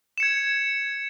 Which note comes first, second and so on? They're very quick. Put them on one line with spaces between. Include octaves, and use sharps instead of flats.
E7 C#7 G#6